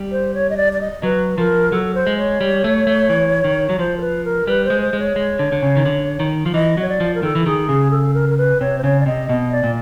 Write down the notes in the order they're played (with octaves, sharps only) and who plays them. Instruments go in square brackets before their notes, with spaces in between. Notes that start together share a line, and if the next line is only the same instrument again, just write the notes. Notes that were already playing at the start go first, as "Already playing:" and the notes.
Already playing: [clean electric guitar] G3
[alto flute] C5
C#5
D#5
D5
D5
D#5
[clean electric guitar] F#3 [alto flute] B4
[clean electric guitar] F3 [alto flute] A#4
[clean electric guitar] F#3 [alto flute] A4
[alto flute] C5
[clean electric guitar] G#3
[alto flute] C#5
[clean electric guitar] G3
A3
A3
E3
D#3
F#3
[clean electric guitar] F3 [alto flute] C5
[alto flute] A#4
B4
A#4
[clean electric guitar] G3 [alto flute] B4
[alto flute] C5
[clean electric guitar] G#3
[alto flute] C5
[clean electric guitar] G#3
[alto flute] C#5
[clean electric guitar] G#3
D3
D3
C#3
D#3
D3
D#3
F3
[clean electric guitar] E3 [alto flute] D#5
[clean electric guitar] F#3 [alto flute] C#5
[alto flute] D5
[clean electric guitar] F3
[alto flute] A#4
[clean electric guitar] D#3 [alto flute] A4
[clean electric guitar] E3
[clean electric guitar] D#3 [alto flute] G#4
[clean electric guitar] C#3 [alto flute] G#4
[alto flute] A4
A#4
A#4
B4
[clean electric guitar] C3 [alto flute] C#5
[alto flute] C5
[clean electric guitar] C#3 [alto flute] C#5
[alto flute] D5
[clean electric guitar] C3 [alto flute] D#5
[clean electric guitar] B2 [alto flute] D#5
[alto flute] D5
[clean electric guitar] A#2